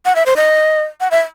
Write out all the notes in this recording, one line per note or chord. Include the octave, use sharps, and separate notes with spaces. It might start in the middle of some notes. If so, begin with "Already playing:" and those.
F#5
E5
C5
D#5
F#5
E5